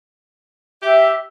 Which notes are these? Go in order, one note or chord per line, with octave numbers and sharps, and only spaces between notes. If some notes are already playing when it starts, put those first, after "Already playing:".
G4 E5